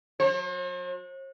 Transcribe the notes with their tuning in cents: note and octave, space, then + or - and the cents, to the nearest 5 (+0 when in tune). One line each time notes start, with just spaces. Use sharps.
F#3 -35 C5 +45